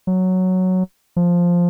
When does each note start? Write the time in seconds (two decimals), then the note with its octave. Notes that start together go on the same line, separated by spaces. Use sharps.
0.07 F#3
1.16 F3